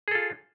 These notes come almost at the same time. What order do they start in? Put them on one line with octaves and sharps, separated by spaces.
G#4 A4 F4